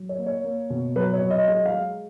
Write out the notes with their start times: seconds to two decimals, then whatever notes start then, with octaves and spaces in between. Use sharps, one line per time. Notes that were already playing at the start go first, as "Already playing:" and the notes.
Already playing: F#3
0.09 C#5
0.18 A#3
0.26 C#5
0.44 A#3
0.70 B2
0.96 F#3 B4
1.13 C#5
1.22 F#3
1.30 D#5
1.48 G#3 D#5
1.65 F5
1.73 G#3